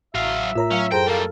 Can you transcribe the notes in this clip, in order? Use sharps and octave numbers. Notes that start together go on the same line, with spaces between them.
A1 F#3 E5 F5
A2 F4 A#4 C#5 A#5
F#3 C#4 F5
F#2 G#4 A4 C5 G5 A#5 A#6
G3 A#3 A4 A#4 F5